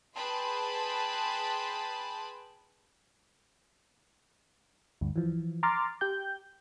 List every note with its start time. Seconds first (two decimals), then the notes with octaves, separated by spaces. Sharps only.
0.15 G#4 B4 G5 A5 B5 C6
5.01 D2 G2
5.16 E3 F3
5.63 A#5 C6 D6 F6 A6
6.01 G4 G5 G6